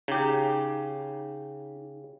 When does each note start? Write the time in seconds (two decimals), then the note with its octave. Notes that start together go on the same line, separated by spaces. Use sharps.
0.08 C#3 D#4 G4